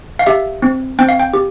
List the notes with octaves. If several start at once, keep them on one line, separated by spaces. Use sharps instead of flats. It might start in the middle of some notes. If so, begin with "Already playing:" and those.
F5
G4 E5
C4
C4 G5
F5
G5
G4